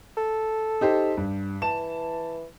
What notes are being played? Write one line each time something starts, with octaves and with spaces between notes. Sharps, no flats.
A4
D#4 G4 C5
G2
E3 A5 E7